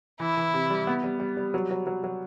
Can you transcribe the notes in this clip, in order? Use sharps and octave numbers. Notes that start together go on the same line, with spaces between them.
E3 E4
E3
C3
G3
B3
G3
G3
G3
F#3
F#3
F#3
F#3